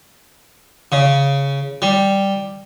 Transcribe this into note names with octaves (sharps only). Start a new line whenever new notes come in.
C#3
G3